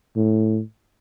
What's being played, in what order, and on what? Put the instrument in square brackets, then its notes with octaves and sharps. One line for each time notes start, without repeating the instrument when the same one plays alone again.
[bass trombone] A2